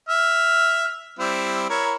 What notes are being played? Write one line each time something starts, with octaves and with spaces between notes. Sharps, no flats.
E5 F6
G3 C4 E4
E4 A#4 C#5